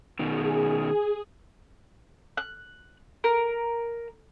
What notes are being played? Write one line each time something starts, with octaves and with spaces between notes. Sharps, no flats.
B2 D#3 G#4
F#6
A#4